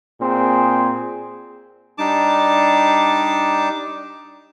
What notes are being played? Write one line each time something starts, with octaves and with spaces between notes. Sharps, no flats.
A#2 C4 G#4
G3 D4 D#4 A5 D6